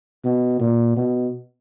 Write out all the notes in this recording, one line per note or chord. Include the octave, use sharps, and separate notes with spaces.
B2
A#2
B2